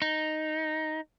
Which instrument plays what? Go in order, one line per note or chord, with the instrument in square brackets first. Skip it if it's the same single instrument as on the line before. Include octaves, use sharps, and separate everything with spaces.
[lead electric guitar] D#4